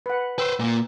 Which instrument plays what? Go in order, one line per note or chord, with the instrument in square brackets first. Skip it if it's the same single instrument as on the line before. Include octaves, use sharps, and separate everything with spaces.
[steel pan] B4 F#5
[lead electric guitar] B4 C5 [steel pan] G5 E6
[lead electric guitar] A#2 A#3